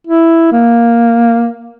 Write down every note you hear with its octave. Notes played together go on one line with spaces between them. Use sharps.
E4
A#3